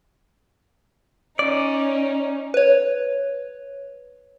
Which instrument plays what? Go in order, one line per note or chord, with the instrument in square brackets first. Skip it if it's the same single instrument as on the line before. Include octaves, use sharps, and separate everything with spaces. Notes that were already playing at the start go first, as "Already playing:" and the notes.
[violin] C#4 D#4 [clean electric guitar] D5
[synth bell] B4 C#5